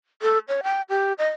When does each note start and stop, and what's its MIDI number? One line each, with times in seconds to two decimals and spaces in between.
0.22 0.38 69
0.48 0.61 73
0.63 0.82 79
0.89 1.13 67
1.18 1.29 75